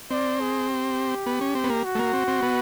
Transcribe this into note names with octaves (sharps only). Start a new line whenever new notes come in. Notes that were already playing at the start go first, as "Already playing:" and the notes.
C4 D5
G#4
G4
B3
C#4
C4
B3
A#3
F#4
A3
A#3
C4
C4
B3